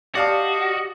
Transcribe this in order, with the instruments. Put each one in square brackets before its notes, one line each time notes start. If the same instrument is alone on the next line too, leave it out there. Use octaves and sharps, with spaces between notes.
[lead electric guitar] F#4 [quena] G4 [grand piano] D5 F5 A5 [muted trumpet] D#5